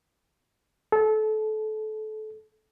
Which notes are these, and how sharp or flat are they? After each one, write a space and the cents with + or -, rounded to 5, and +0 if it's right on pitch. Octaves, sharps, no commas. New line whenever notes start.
A4 -25